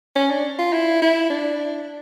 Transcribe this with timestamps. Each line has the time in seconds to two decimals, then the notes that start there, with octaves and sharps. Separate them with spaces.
0.16 C#4
0.30 D4
0.59 F4
0.73 E4
1.02 E4
1.30 D4